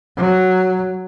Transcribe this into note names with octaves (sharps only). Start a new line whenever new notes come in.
F#3